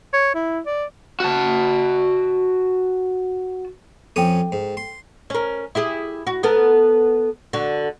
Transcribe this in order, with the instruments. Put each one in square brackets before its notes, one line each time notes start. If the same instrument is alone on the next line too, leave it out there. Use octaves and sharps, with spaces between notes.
[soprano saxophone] C#5
E4
D5
[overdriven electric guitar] F#4 A5
[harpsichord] F2 C#4 D#6 [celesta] A4 G5
[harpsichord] G#2
C6
[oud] C#4 A#4
E4 G4 G#4
F#4
B3 A4 A#4
D3 F#4